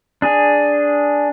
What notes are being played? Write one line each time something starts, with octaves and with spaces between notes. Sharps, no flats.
D4 G#4